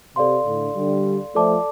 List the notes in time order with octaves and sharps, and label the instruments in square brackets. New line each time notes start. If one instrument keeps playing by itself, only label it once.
[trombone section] C3 [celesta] A4 D5 F5 C6
[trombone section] A2 D3
D3 G3
[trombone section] F3 A3 [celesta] A4 D5 A5 D6